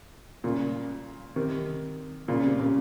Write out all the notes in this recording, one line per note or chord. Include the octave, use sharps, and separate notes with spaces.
A#2 C#3
C3 D#3
A#2 C#3
C3
A#2 C#3